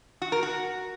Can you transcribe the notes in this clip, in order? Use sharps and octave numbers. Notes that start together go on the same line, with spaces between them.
F#4
A#4
F#4